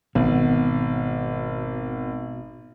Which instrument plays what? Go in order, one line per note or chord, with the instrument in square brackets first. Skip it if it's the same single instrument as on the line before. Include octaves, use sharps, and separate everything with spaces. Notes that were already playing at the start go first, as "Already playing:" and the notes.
[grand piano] G#1 [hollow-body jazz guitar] B2